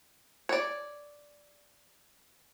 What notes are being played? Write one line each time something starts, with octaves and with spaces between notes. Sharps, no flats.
C#5 D5